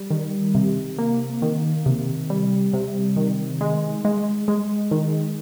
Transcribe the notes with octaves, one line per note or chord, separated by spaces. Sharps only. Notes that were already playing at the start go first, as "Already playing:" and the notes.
Already playing: G3
D#3
C3
A#3
D#3
C3
G3
C3
D#3
G#3
G#3
G#3
D#3